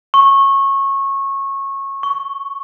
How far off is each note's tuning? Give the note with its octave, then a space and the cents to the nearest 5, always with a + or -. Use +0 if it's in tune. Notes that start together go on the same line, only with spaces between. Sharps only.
C#6 -20
C#6 +10